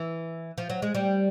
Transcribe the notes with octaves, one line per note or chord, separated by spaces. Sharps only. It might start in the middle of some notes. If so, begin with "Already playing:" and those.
Already playing: E3
F3
F#3
G#3
G3